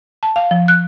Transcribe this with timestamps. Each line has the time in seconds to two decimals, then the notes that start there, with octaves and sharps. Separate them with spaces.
0.23 A5
0.36 F5
0.51 F3
0.68 F#6